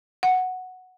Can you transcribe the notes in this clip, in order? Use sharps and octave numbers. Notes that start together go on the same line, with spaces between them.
F#5